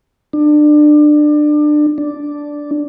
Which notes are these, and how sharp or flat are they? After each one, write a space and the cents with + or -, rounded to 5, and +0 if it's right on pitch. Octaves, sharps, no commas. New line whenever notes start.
D4 +25
D4 -5